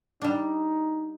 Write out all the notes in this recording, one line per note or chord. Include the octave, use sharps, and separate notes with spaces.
G3 D4 D#4